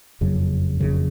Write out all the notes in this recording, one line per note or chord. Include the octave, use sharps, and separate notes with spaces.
F#1 F2 C#3 F#3
F#1 F2 C#3 F#3